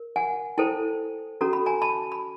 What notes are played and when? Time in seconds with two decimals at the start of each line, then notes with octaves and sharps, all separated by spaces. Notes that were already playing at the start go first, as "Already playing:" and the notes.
Already playing: A#4
0.16 F#5 G#5
0.58 E4 A4 C5 G5 A5
1.41 C#4 F#4 A4 A#5
1.53 B5
1.66 G#5 A#5
1.82 A5 B5
2.12 B5